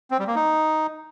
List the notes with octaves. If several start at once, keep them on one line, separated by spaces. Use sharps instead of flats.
C4
G3
A#3
D#4